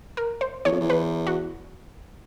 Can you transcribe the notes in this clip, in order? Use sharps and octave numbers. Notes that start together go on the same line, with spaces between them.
A#4
C5
E2 C#5
F2
E2
B4
F#4